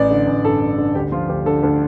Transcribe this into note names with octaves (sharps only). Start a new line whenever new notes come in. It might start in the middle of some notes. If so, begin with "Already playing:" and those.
Already playing: A1 D5
D3
A1
G2 A4
A1
D3
D2 G4
F3 F4
D2 G4
D3 A4
D2 A4